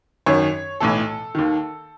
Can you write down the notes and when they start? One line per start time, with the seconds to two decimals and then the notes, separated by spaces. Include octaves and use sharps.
0.26 G#1 F#2 D#3 C#5
0.80 B1 A2 E3 A4
1.35 D#2 D#3